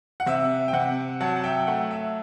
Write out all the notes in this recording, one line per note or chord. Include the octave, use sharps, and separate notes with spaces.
F#5
C3 E5
G5
C3 F#5
F#3 F#5 A5
A5
E5 G5
G5
A3 F#5
E5